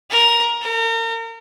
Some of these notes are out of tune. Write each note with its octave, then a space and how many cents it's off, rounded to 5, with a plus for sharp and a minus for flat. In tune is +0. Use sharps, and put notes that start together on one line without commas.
A#4 +10
A#4 -35